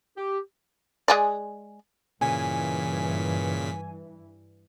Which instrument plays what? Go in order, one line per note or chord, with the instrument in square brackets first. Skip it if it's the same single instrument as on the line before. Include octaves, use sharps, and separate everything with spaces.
[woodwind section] G4
[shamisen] G#3 G#4 D5
[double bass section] G2 E3 [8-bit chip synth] A#2 C#3 B6 [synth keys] G#5